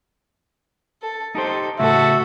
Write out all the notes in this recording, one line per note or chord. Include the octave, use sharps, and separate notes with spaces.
A4
D#4 G4 A4 C5
A2 C#3 F#4 A4 E5